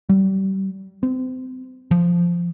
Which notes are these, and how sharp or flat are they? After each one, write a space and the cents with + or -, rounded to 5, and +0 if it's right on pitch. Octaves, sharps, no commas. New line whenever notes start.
G3 -30
C4 -30
F3 -10